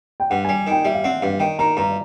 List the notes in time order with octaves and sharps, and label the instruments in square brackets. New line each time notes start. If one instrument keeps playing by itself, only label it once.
[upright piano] G5
[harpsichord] G2 [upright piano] F#5
[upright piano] G#5
[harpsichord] G3
[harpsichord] D#3 [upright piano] G5
[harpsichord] G3 [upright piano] E5
[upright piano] F5
[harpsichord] C4 [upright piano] F#5
[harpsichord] G2 [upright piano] F5
[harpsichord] D#3 [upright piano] G5
[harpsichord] D#3 [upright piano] A#5
[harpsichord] G2 [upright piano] A#5